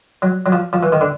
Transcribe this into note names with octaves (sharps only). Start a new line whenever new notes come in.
F#3
F#3
F3
F3
E3
D#3
D3